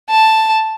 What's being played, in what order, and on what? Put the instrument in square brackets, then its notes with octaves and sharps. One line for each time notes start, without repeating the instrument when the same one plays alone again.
[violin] A5